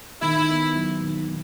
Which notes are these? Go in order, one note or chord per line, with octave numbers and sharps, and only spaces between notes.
D#3 E4
B3
F#3
D#3
D#3